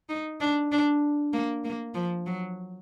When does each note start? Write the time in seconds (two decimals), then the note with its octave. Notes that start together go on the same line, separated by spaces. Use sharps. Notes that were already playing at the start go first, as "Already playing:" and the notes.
0.09 D#4
0.41 D4
0.72 D4
1.33 A#3
1.64 A#3
1.94 F3
2.27 F#3